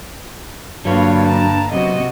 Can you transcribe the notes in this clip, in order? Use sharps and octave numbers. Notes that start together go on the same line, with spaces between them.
G2 D3 F#3 A#3 D4 F4 B4 C#5
A5 A#5
F#2 C3 B3 F#4 D#5